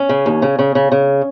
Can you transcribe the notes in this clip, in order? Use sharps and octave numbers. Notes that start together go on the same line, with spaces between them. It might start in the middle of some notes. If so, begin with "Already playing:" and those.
Already playing: C#4
C#3
D#2
C#3
C#3
C#3
C#3